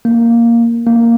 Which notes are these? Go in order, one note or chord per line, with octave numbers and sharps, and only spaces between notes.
A#3
A#3